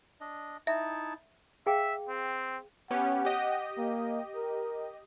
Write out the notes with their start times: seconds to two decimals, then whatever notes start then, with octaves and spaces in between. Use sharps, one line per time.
0.21 D4 D#5
0.67 D#4 E4 E5 A5
1.66 G#4 E5 F5 G5
2.09 C4
2.91 B3 C#4 G4 F#5
3.25 G4 D#5
3.77 A#3
4.36 A#4